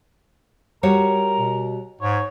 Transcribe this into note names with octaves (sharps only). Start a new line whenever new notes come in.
G3 F#4 A#4 C#5
B2
G#2 C#5